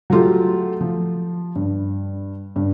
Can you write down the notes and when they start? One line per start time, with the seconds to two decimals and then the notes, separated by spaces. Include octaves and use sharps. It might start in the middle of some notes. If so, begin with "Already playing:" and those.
0.10 F#3 A3 F4 G4
0.81 F3
1.56 G2
2.56 G2